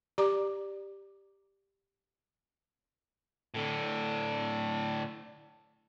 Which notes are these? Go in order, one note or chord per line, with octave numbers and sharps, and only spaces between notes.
G4 D5 A#5 D6
A2 D3